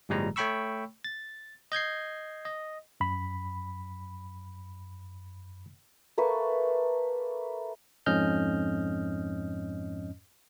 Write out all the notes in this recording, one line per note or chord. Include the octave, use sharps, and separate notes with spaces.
G1 A2 F3 G3 G#3 A#5
A3 C#5 G5 B5 C#6 E6
A6
D#5 G6 G#6 C7
D#5
F#2 B5
A3 A#3 B4 C#6
F2 G#2 C#4 D#5 F6 G6